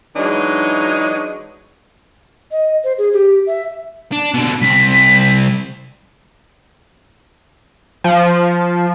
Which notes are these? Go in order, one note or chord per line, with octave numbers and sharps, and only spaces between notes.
E3 F#3 G#3 D4 D#4
D#5
C5
G#4
G4
E5
D4
B2 D3
C2 C4 B6
F3